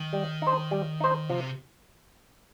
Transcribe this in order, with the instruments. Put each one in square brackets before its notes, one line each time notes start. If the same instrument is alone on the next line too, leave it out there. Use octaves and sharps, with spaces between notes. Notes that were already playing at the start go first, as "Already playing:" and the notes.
Already playing: [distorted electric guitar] D#3
[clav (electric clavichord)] G3
D#4 C5
G3
D#4 C5
[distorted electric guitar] C3 [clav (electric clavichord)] F3